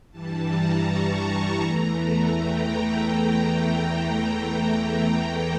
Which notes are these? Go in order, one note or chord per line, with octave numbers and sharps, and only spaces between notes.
G2 E3 G3 A5
A#5
C#6
E2 E3 A3 A#5
G5